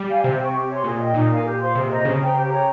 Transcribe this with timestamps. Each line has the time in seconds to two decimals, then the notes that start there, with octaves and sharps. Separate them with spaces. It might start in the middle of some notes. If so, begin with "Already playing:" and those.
Already playing: G3
0.09 F5 G#5
0.24 C3 C5
0.39 G5 C#6
0.54 G4
0.69 C#5 G#5 C6
0.84 A#2 G#4
0.99 D#5 G5
1.14 A#2 D#4
1.30 A#4 F5 G#5
1.45 G4
1.60 C5 F5 C6
1.75 C3 G#4
1.90 C5 D#5 A#5
2.05 C#3 G#4
2.20 C5 G5 A#5
2.35 G4
2.50 C#5 G5 A#5